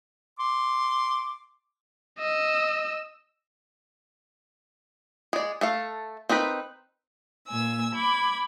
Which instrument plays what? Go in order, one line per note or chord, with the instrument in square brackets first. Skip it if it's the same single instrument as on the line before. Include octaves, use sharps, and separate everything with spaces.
[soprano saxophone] C6 [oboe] D6
[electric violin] D#5 E6
[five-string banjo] G#3 D5
A3 A4 F5
C4 D#4 A#4 B4
[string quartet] A#2 G#5 E6
B5 D6 G#6